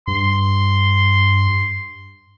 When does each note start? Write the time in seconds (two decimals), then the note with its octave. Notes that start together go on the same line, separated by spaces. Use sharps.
0.07 G2 C6